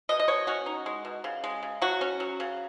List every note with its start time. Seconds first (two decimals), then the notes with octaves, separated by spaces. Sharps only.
0.09 B2 D#5
0.20 D#5
0.28 B2 C#5
0.47 C#4 F#4
0.66 D#4
0.86 G#3
1.05 B2
1.24 C#3
1.44 G#3
1.63 C#3
1.82 F#3 F#4
2.01 C#4
2.20 F#3
2.40 C#3